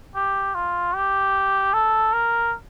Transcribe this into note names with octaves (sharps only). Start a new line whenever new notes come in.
G4
F4
G4
A4
A#4